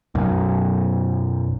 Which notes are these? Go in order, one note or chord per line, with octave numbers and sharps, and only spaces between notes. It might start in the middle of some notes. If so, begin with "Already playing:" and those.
B1 F#2